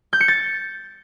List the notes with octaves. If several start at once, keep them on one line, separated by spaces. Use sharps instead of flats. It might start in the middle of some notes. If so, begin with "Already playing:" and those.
G6
C#7
A6